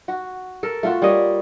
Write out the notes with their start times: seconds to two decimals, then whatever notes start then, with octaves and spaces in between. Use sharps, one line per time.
0.08 F#4
0.63 A4 A#4
0.83 A3 F4 F#4
1.02 G3 A#3 C#5 D#5